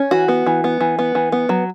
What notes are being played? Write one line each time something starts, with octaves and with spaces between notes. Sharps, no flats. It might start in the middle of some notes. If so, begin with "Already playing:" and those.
Already playing: C#4
E3 F#4
B3
E3
B3
E3
B3
E3
B3
F#3